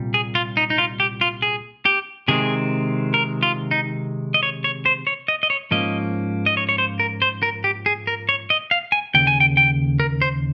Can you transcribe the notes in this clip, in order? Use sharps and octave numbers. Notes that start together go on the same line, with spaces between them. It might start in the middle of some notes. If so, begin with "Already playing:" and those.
Already playing: C2 A#2 G3
G#4
F4
D#4
D#4
F4
G4
F4
G#4
G4
C3 D#3 G#3 C4 G#4
A#4
F4
D#4
D#5
C#5
C#5
C5
C#5
D#5
D#5
C#5
G#2 F3 A#3 C#4 D#5
D#5
C#5
C#5
C5
A#4
C5
A#4
G4
G#4
A#4
C#5
D#5
F5
G#5
D#2 C#3 G5
G#5
G5
G5
A#4
C5